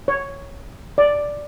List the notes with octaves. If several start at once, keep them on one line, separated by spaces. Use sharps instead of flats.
C#5
D5